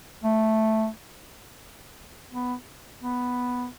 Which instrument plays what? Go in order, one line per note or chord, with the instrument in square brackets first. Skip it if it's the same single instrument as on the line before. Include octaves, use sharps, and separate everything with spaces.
[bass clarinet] A3
B3
B3